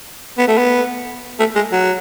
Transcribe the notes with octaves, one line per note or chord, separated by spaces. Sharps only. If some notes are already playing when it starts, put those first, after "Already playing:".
B3
A3
B3
A3
G#3
F#3